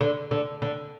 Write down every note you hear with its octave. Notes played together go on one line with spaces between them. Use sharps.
D3
D3
D3